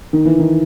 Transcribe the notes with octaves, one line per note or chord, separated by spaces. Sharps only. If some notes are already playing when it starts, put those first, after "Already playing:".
D#3
E3
D#3